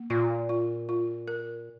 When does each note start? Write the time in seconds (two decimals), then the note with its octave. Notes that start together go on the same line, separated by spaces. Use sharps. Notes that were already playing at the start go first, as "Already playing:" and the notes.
Already playing: A#3
0.10 A#2 F4
0.49 F4
0.89 F4
1.28 A#4